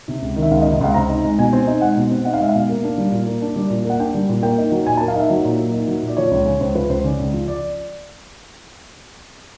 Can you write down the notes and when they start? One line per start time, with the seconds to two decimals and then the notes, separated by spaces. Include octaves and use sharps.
0.08 C3
0.22 C#2
0.36 D#3
0.42 E5
0.51 C#2 F5
0.62 D#5
0.66 C3
0.73 D#5
0.81 C#2 F5
0.94 C4 A#5
1.09 D#4
1.24 G#3
1.38 B2 G#5
1.53 C4
1.67 D#4
1.81 G#3 F#5
1.97 B2
2.11 C4
2.25 D#4 F#5
2.34 F5
2.40 G#3 E5
2.49 F5
2.55 B2
2.69 A#3
2.84 D4
2.98 G3
3.12 A#2
3.26 A#3
3.42 D4
3.56 G3 D5
3.70 A#2
3.85 A#3 F#5
3.99 D4 G5
4.14 G3
4.29 A#2
4.43 A#3 G5
4.58 D#4
4.72 F#3
4.86 A#2 G#5
4.97 A#3 A5
5.08 F5
5.16 D#4 E5
5.30 F#3
5.45 A#2
5.59 A#3
5.73 D#4
5.87 F#3
6.02 A#2
6.08 D5
6.17 F3 C#5
6.31 C#2
6.46 C#3
6.61 C#2 C5
6.75 F3 B4
6.89 C#2 C5
7.04 C#3 D5
7.19 C#2
7.33 F3
7.48 D5